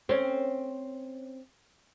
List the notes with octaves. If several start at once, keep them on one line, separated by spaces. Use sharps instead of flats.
C4 C#4